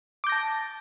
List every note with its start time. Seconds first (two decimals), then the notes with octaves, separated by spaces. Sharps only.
0.24 D6
0.27 G6
0.29 A#6
0.32 A5